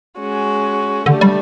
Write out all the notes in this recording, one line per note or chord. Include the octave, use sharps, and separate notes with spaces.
G#3 C#4 F#4
D3 A3 D4 G4
G3